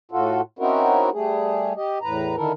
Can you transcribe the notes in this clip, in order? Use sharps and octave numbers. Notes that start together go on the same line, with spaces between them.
A2 F4 F#4 A4
C4 C#4 D#4 E4 F#4 A#4
G3 A3 G#4
G4 D#5
E2 A2 B4 A#5
D3 D#3 E4 A4 A#4